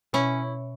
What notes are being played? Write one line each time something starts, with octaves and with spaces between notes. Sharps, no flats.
B2 C#4 E4